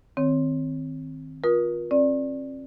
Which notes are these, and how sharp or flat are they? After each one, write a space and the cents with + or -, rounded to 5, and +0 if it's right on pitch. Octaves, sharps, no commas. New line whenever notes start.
D#3 +0 C4 +0 C#5 +0
F4 +25 A#4 +40 D#6 +0
C4 +40 D5 +0